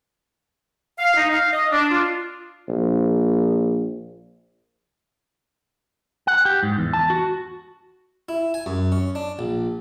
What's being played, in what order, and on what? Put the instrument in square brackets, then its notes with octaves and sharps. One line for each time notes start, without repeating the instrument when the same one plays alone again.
[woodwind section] F5
D#4
F5
D#5
D4
F4
[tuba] A#1
[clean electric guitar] F#5
G4
G#2
E2
A5
F#4
[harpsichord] E4
G#5
F#2
C#4
D4
A#1